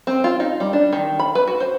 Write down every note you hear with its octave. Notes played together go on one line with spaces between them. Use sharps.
C4
F4
D#4
G3
D4
D#3
B5
B4
F#4
C5